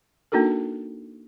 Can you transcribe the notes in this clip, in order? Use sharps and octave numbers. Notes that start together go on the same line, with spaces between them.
A#3 D4 D#4 F#4 A4 A#4